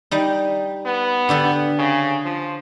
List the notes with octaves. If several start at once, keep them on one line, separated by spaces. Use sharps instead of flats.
G3 D#4
B3
D3 G4 A4
C#3
F3